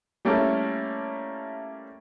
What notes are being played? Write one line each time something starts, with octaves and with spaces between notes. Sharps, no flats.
G3 A3 A#3 C#4 E4 A4